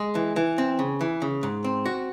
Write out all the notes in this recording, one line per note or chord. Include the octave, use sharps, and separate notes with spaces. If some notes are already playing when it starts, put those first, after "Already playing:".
Already playing: G#3
E3
E3
C4
C#3
E3
C#3
G#2
C4
F#4